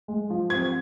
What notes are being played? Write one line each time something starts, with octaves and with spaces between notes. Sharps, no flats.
G#3
F3
C4 G#6